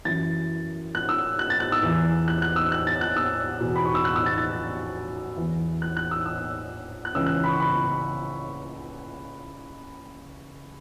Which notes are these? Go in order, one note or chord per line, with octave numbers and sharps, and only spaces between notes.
F#2 E3 A6
F#6
E6
F#6
A6
F#6
E6
E2 E3
F#6
F#6
E6
F#6
A6
F#6
E6
E2 B2
B5
C#6
E6
F#6
E6
A6
A6
E2 E3
F#6
F#6
E6
E6
F#6
C#2 C#3 E3 E6
F#6
B5
C#6
B5